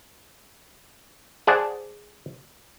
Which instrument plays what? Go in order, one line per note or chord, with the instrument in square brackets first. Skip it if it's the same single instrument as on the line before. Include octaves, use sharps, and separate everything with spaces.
[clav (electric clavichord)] G#4 C5 D5 F#5 G#5 A5